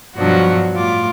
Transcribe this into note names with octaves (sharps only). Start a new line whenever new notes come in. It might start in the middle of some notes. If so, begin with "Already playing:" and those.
G2 B2 F3 F#3 D4 F#4
A2 F4 D6